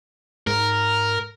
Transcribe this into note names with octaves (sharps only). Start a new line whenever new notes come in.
G#2 A#4